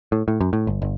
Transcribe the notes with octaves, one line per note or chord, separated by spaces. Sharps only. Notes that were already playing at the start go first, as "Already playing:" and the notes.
A2
A2
F#2
A2
G1
G1